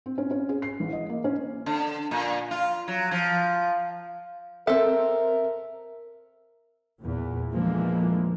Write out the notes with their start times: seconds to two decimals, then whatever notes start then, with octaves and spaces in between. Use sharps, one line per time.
0.06 C4
0.18 C#4
0.31 C#4
0.49 G#4
0.62 C7
0.80 A1
0.93 D#5
1.09 A#3
1.24 C#4
1.66 D3
2.11 A#2
2.51 F4
2.88 F#3
3.11 F3
4.67 C4 A4 A#4 E5
7.00 E2 A#2
7.53 A#2 D3 E3 F3 G#3 A#3